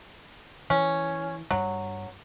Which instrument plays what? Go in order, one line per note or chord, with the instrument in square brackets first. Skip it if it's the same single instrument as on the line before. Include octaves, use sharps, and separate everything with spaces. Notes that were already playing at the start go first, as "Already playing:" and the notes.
[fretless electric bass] E3 [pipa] C#4
[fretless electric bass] G2 G3 [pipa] F#3